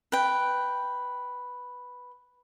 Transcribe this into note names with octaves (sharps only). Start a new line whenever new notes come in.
B4 G5